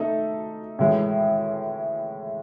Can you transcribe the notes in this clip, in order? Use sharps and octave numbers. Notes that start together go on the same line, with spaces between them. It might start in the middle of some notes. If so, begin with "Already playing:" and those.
Already playing: A3 D#4 A4
A2 E3 G#3